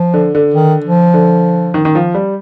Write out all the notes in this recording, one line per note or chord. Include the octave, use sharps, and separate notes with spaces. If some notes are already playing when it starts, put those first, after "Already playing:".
Already playing: F3
D3
D3
D#3
F3
D3
D#3
D#3
F3
G3